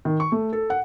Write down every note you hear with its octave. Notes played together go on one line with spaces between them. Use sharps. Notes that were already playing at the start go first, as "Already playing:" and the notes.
D#3
C#6
A3
A4
F#5